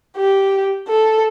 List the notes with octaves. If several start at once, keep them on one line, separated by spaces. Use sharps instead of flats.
G4
A4